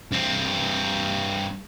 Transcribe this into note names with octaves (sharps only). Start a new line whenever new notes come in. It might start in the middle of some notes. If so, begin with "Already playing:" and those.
G2 C4